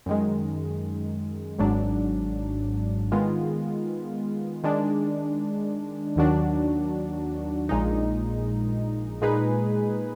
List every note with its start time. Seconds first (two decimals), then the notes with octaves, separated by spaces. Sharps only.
0.06 F#2 D#3 G#3
1.59 G#1 G#2 F#3 D4
3.12 D#3 G#3 B3 F4
4.64 D#3 G#3 D4
6.16 D#2 D#3 F#3 D4 F#4
7.69 A#1 A#2 G#3 D#4
9.21 A#2 G#3 D#4 G#4 B4